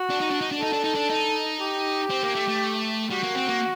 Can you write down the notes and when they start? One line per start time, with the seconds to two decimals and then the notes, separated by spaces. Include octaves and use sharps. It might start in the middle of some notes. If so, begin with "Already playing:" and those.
Already playing: F#4
0.09 D4
0.20 D#4
0.30 D4
0.41 D#4
0.52 D4
0.60 D#4 A4
0.73 D4
0.84 D#4
0.95 D4
1.10 D#4
1.60 G4
2.10 C4
2.23 A#3
2.35 A3
2.48 A3
3.10 G3 F#4
3.24 A#3
3.36 C4
3.49 A#3